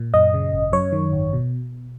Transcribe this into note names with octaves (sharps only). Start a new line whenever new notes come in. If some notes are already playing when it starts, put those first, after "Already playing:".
Already playing: A#2
F#2 D#5
C#3
G#1
F#2 C#5
D#3
G#1
B2